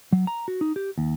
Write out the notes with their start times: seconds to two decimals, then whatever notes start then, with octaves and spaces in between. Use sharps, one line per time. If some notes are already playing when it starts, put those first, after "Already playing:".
0.13 F#3
0.27 A#5
0.48 F#4
0.61 D#4
0.76 G4
0.98 D#2